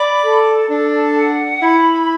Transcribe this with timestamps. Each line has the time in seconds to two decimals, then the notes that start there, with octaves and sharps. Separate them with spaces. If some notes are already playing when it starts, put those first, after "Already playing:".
Already playing: D5 B5
0.23 A4
0.69 D4 A4
1.16 F#5
1.62 E4 B5